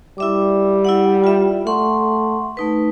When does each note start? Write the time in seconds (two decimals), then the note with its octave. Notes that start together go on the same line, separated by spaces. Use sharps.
0.18 G3 E4 E5 D6
0.85 E4 D5 F#5
1.24 F4 E5
1.67 A3 F#5 C6 C#6
2.57 A3 D#4 B4